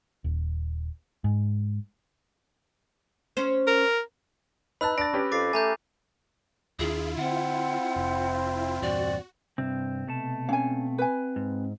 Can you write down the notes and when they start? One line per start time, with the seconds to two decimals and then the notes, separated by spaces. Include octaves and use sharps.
0.24 D#1
1.24 G#2
3.37 C#4 C5
3.67 A#4
4.81 D#4 B4 A5 B5 E6 F#6
4.98 D4 A6 A#6 D7
5.13 C#4 G4 B4
5.32 F2 D6 A6 C7
5.53 A3 G#5 A#5 G6
6.79 D#2 D#3 D4 E4 F4 G#4
7.17 D3 C4 F#5
7.96 F1
8.82 E2 G2 A#2 F#4 D5
9.58 G2 C3 C4
10.07 B2 A3 A5
10.49 C4 C#4 F5 G#5
10.98 B4 G#5
11.36 G#2